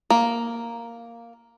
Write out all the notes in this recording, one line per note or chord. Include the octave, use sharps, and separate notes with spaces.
A#3